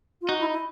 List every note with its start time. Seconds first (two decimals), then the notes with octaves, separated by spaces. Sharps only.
0.21 F4
0.28 D#4 F#4
0.40 E4
0.52 E4